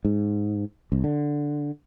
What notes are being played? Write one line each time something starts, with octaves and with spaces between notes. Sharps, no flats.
G#2
C2
D3